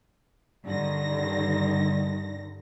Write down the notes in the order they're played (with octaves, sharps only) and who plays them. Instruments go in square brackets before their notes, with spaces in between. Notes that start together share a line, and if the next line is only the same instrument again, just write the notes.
[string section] G2 D3 D#3 A#6